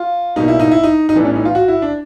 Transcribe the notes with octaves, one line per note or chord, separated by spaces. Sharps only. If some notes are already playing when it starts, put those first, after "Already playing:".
Already playing: F4
B2 G3 A#3 D#4
E4
D#4
E4
D#4
D#4
A2 E3 G3 B3 D4
C#4
D#4
F4
F#4
E4
D4